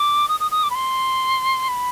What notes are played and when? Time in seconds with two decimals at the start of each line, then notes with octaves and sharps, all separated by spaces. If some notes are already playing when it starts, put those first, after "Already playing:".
Already playing: D6
0.28 D#6
0.40 D#6
0.51 D#6
0.63 D6
0.70 B5
0.75 C6
1.68 B5